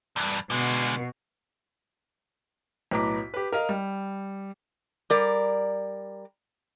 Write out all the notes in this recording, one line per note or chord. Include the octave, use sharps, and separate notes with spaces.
E2 G2
B2 D3 G#3
B1 A2 B4 A#5 D6 B6
G4 B4
A#4 D#5 F5
G3
G3 A#4 D5